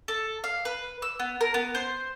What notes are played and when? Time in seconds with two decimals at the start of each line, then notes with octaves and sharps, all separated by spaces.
0.08 A4
0.44 F5
0.65 B4
1.02 E6
1.20 B3
1.41 A#4
1.54 B3
1.75 C5